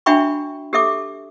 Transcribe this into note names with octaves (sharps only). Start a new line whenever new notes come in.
D4 F#4 E5 G5 B5 C#6
G4 A4 E5 D6